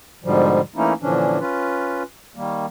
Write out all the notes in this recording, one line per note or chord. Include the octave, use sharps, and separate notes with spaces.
G#2 B2 D3 F3 G3
E3 A3 A#3 C#4 D#4 E4
A#2 D3 E3 F3 C#4 D4
C#4 F4 B4
D#3 G3 A#3